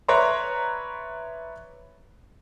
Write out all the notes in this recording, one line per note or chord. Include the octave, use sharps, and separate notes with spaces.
B4 C#5 D5 E5 A#5 C6